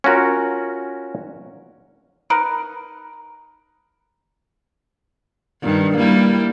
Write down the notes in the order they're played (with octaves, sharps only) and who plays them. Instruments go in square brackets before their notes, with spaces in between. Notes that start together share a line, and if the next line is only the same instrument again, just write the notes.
[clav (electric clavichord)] C#4 F4 F#4 A#4
[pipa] D#4 A#4 B4
[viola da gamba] G2 D#3
G3 A#3 E4